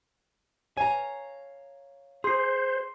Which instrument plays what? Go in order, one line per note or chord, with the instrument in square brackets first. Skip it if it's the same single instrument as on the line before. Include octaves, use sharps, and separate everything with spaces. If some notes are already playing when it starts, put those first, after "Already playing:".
[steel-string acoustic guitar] C#5 F5 A#5 [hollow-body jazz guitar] G#5
[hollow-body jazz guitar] G#4 [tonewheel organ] C5 [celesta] C6 C7